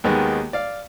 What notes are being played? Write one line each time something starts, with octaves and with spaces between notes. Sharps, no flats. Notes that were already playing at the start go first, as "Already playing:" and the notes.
D#2 D#3 G#3 B3
D5 F5